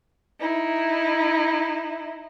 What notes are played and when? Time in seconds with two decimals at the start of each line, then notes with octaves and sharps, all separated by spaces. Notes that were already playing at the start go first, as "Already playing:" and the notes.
0.40 D#4 E4